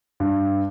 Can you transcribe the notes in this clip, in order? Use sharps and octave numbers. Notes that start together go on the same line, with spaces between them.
G2